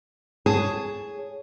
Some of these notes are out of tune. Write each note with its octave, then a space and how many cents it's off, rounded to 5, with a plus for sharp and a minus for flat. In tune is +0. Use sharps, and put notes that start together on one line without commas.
G#4 +0 C#5 +15 A5 +0